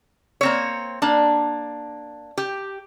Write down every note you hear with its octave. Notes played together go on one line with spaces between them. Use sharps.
A#3 C4 C#5
A#3 D4
G4